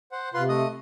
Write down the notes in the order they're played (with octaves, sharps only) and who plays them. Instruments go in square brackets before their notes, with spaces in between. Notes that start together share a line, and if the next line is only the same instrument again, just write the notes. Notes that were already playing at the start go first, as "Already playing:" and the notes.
[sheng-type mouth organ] C5 F#5
[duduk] C3 [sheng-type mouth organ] F4 B4 C6
[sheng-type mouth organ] A3 D#5 D#6